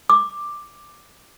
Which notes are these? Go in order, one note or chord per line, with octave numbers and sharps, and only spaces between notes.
D6